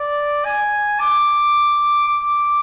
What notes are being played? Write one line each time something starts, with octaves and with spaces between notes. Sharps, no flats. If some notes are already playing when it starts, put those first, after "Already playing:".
Already playing: D5
G#5
D6
D6